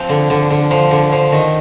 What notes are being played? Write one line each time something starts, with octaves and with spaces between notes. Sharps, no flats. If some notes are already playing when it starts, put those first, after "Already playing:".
Already playing: F3 C4
D3
D3
D3
F3
D3
F3
D#3